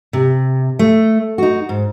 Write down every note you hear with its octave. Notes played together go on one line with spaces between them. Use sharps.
C3
A3
D#4 F#4
G#2